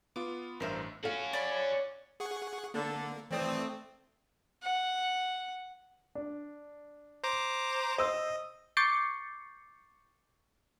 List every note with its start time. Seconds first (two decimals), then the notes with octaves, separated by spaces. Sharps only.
0.16 B3 F4 D6
0.60 A1 G2 A#4 C5 E5
1.03 C#4 F#4 A4 F5
1.33 C#5 D5 B5
2.20 G#4 F#5 C#6
2.74 D3 A#3 A4
3.31 E3 A3 C4 D5 D#6
4.63 F#5
6.15 D4
7.24 C5 A#5 D6
7.98 C5 D#5 E6
8.77 C#6 D6 G6 A6 C7 C#7